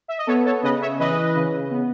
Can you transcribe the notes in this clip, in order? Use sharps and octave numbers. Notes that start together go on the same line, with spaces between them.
E5
D#5
B3 A4 C#5
A4 C#5
C#3 B4 D#5
C#5 E5
E3 B4 D#5
C#3
B3